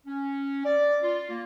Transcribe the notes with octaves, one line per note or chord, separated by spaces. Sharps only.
C#4
D5
F4
A#3